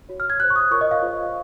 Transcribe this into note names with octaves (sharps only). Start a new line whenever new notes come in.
F#4 C#5
F6
G#6
F#4 C5 F#6
C#6
D#6
F4 A#4 C#5 C#6
D#5
F5
F4 G#4 C5